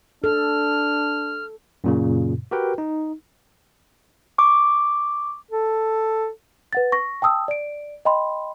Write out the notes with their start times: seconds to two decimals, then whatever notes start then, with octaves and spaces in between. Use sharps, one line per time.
0.24 D4 A4 F6
1.84 F#2 A#2 C#3
2.51 F#4 G4 A#4 B4 G5
2.78 D#4
4.38 C#6 D6
5.51 A4
6.73 B4 F#5 A6
6.92 C#6 A#6
7.22 G5 A5 D#6 E6
7.48 D5 D7
8.05 D#5 G5 B5 C6